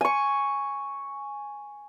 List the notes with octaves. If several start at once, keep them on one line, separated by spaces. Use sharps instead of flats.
G#5 C#6